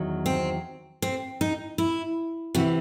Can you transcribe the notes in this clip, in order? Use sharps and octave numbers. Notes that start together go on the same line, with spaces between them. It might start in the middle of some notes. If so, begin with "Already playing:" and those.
Already playing: E2 D#3 F#3
C4
C4
D#4
E4
C3 E3 F#4